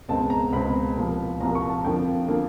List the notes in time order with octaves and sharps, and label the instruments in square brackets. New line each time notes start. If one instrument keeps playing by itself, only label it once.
[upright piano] C#2 B2 G#3 C4 A5
A#5
C#2 B2 G#3 C4 B5
C2 A#2 F3
C2 A#2 F3 A#5
C#6
A5
F2 D3 F3 A#3 G5
D3 F3 A#3